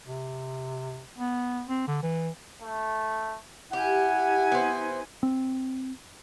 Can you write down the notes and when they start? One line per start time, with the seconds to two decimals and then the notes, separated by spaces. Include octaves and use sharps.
0.07 C3
1.17 B3
1.68 C4
1.87 D3
2.03 E3
2.62 A3
3.73 E4 G4 F#5 G#5
4.52 B3 C4
5.23 C4